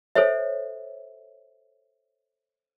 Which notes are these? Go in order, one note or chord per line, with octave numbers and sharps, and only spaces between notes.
A4 C5 C#5 E5